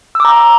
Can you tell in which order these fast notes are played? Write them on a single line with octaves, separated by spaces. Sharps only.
E6 D6 A#5